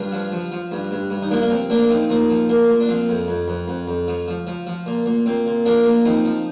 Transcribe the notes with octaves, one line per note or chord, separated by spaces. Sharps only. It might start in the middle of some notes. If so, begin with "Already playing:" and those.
Already playing: G2 D4 F4
F3
F3
F3
G2
G2
G2
D#4
F3 A#3 D4
A#3
F3 C4
A#2 A#3 D4
F3 C4 D#4
A#2 C4 D#4
F3
A#2 A#3
A#2
D4
F3 C4
F2
F2
F2
F2
F2
F3
F3
F3
F3
A#2
A#2
A#2 C4
A#2
F3 A#3 D4
A#2
F3 C4 D#4
F3